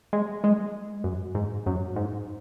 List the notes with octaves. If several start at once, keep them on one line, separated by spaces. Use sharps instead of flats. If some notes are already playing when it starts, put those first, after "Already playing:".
G#3
G#3
F#2
G#2
F#2
G#2